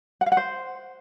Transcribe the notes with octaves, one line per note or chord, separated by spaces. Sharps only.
F#5
F5
F#5
C5